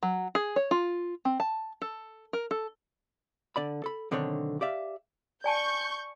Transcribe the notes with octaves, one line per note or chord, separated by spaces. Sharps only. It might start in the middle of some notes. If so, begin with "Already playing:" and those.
F#3
G#4
C#5
F4
C4
A5
A4
A#4
A4
D3 D5 B5
A4 B5
B1 D3 D#3 C4 D4 C#5
G4 D5 E5 F5
D5 G#5 A5 C#6 G6